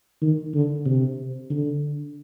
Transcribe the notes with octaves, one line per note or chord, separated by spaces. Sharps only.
D#3
D3
C3
D3